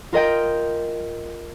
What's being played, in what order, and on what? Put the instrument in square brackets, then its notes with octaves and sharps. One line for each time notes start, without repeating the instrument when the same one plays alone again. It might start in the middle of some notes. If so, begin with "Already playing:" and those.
[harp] F4 A#4 D#5 G5